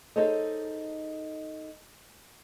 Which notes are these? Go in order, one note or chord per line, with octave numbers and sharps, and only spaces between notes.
D#4 G#4 A4 C5 C#5 D#5